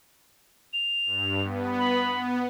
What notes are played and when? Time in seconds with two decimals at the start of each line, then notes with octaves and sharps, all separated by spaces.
0.73 F7
1.06 G2
1.41 B3
1.78 B5
2.17 B3